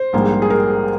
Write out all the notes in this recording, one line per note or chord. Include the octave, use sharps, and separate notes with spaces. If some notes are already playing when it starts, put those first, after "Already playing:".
Already playing: C5
A#1 G#2 G3 A#3
G#4
A#4